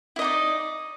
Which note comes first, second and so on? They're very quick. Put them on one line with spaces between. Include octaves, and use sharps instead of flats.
E4 D#5 D#4 D5